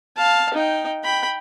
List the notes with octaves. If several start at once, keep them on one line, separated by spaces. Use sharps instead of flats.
F5 A5
D#4 G5
G5 B5